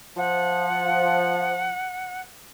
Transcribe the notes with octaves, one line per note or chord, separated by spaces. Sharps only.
F3 F#5